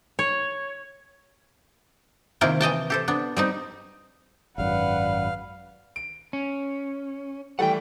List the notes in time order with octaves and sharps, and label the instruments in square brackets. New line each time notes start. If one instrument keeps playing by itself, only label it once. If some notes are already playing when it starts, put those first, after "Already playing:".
[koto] C#5
C3 D#3 A#3 E4 F4 G5
E3 D#5 G5 A5
G4 A4 C5
B3 D4
G3 C4 D#4
[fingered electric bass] G#1 F#2 [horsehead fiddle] B4 F#5 [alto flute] D5 [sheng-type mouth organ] F5
[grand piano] D7
[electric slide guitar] C#4
[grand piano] E3 G3 A3 [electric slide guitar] F#5 G5